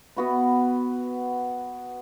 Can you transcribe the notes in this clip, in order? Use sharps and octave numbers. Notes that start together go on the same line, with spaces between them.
B3 F#4 B4